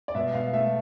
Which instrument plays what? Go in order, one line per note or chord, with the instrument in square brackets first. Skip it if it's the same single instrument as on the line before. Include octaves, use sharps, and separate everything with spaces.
[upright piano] D5
B2 E5
B2 F5
A3 E5